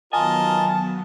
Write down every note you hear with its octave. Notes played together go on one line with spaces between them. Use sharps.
D#3 F#3 B3 F4 A#4 D#5 G#5 A5